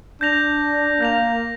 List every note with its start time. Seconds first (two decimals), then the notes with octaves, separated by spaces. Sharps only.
0.21 D4 G6 A#6 F7
1.00 A#3 G6 A#6 F7